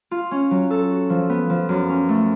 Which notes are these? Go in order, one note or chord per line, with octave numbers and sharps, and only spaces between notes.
F4
C#4
F#3
A4
F#4
F3
B3
F3
F#2
C#4
A3